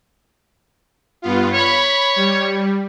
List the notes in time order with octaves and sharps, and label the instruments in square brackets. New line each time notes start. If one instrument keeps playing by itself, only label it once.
[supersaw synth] G2 B3 F4
[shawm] C#5 [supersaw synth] B5
[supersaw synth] G3